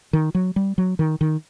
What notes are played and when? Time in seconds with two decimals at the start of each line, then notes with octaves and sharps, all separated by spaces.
0.13 D#3
0.35 F#3
0.56 G3
0.78 F#3
0.99 D#3
1.21 D#3